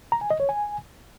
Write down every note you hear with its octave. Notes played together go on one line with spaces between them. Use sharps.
A#5
G#5
D#5
C#5
G#5